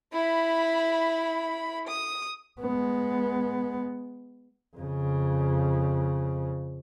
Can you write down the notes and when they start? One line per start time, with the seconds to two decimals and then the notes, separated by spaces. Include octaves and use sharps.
0.13 E4 B5
1.87 D#6
2.60 G#3 B3
4.77 F2 C#3